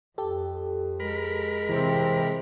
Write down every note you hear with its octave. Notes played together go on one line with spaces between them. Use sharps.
F2 G4 A4
G#3 A#4 B5
C3 E3 C4